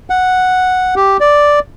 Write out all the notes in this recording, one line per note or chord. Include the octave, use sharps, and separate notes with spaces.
F#5
G4
D5